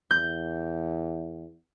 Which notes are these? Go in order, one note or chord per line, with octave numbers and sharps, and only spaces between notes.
E2 G6